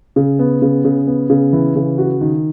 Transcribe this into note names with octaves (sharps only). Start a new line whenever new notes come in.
C#3
B3
C#3
C#3
B3
C#3
E3
C#3
F#4
D#3